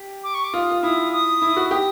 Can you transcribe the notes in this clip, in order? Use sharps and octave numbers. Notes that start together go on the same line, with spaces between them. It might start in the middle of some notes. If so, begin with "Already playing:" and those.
Already playing: G4
D6
C#6
D6
F4 D#6
F4
E4 D#6
D#6
E4
F#4
G4 D#6